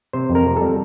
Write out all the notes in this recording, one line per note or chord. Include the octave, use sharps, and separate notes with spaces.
C3 C5
F2
A#4
C3
G3 A4